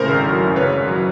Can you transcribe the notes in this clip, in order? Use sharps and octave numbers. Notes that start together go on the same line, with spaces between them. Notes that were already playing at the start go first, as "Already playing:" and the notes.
Already playing: A2 C#3 A#4 C5
G#1
F#3
F#2
C#3 B4 C#5
G#1
F#3